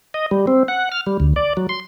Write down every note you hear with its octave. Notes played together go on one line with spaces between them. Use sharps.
D#5
G3
C4
F#5
F6
G3
D2
D5
F#3
C6